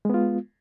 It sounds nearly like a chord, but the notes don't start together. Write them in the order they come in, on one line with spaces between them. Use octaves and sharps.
G#3 B3 F4